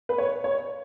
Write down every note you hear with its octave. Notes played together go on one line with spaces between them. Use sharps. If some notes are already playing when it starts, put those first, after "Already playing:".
B4
C#5
C#5